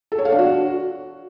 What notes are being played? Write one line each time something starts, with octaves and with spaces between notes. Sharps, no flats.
A4
C#5
F5
D4
F#4